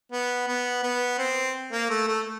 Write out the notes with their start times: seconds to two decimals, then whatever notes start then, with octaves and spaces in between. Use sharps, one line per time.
0.12 B3
0.48 B3
0.83 B3
1.19 C4
1.72 A#3
1.90 A3
2.08 A3